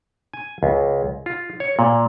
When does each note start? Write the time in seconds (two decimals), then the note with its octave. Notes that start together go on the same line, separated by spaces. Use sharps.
0.33 G#5
0.63 C#2
1.26 F4
1.60 C#5
1.79 A#2